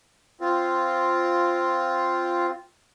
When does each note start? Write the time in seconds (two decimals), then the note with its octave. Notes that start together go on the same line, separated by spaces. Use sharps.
0.41 C4 F4